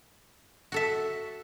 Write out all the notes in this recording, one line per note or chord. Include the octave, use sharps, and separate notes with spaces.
F#4 A4 E5